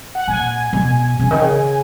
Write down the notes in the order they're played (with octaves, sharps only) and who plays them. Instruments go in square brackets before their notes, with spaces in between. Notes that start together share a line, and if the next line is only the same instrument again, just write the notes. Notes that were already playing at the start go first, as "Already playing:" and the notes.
[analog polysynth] F#5
[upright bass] A#2 [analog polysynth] G#5
[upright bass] B2
C#3
D#3
C#3